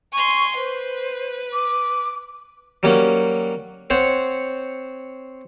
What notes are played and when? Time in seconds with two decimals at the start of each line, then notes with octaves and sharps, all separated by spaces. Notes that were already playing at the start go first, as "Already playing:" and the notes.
0.13 G#5 C6 C#6
0.57 B4 C5
1.53 D6
2.83 F#3 G3 A#3 C#4 F#4
3.90 C4 C5 C#5 F#5